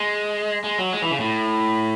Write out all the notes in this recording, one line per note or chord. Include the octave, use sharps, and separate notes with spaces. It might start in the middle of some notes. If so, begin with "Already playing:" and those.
Already playing: G#3
G#3
F#3
G#3
E3
C#3
A2